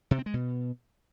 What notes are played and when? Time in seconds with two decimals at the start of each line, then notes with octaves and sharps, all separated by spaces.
0.11 C3
0.19 C4
0.26 G#3
0.34 B2